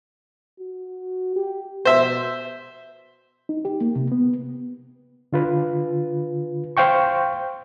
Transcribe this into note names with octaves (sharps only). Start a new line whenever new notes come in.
F#4
G4
B2 C5 E5
D#4
G4
A#3
C3
B3
D3 F4 B4
C5 F5 G5 C#6